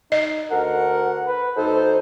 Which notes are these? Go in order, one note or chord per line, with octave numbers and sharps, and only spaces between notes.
D#4 D#5
D2 A#4 F#5
B4
D2 D#4 A4 C5